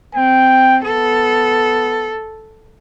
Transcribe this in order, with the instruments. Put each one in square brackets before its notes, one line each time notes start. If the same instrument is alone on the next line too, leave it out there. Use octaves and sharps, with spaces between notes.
[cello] C4 [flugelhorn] G5
[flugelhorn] B3 [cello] A4